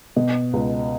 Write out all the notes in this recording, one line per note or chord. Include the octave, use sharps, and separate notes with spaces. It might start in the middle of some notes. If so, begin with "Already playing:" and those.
B2
C#2